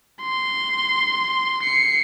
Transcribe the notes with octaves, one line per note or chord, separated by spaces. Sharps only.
C6
C7 C#7